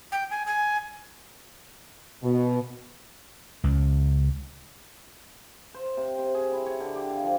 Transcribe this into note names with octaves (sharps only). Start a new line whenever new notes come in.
G5
G#5
G#5
B2
C#2 C#3
C5
C3
C3
G#4
E4
C#5
D3
G4
F5
F3